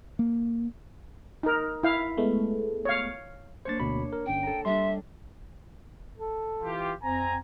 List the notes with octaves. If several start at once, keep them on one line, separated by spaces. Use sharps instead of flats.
A#3
D#4 A#4
E4 F5
G#3 A3 B3
C#5 F5
A#3 D4 C5 C#5 A6
D2 B2 B5
A#4
G1 C#4 G5
A4 A#5
G3 D4 E5 C6
A4
E3 F4 G4
F2 C4 G#5 A#5